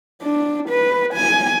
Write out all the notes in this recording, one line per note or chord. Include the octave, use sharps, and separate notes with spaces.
D4
B4
G#5